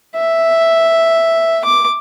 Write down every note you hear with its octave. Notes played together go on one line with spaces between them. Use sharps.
E5
D6